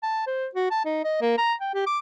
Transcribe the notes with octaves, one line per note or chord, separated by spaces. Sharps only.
A5
C5
F#4
A5
D#4
D#5
A#3
A#5
G5
G4
D6